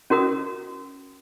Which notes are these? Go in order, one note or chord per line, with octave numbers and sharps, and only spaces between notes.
C#4 F#4 A#4 D#6